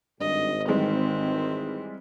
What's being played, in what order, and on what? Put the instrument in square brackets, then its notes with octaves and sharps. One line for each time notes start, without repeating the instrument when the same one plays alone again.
[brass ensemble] G#1 [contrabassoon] G2 [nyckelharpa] D#5
[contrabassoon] D#3 [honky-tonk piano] E3 G3 G#3 [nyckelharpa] C4